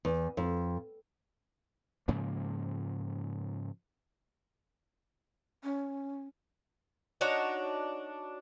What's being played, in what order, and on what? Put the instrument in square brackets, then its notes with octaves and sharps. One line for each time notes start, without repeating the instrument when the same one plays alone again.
[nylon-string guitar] E2
F2
[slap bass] G#2 C#3 F3 A#3
[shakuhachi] C#4
[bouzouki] D4 D#4 F#4 C#5